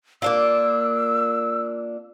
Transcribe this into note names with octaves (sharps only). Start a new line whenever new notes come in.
A#3 D4 F4 E6